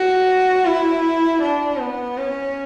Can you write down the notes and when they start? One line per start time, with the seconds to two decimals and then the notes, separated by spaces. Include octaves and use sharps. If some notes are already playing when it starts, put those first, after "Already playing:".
Already playing: F#4
0.66 E4
1.42 D4
1.80 B3
2.18 C#4